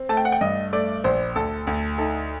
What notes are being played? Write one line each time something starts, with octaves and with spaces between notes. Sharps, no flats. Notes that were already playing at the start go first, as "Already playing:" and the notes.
Already playing: C4
A3 A5
G5
F#5
G5
G2 D#5
A3 D5
A#1 C5
D2 A4
D2
D#4 A4